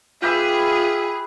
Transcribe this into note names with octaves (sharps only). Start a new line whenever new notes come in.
F4 G4 G#4 B4 E5